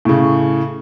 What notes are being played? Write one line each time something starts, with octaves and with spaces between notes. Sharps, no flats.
A2 C#3